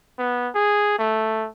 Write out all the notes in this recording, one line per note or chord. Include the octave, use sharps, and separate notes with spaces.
B3
G#4
A3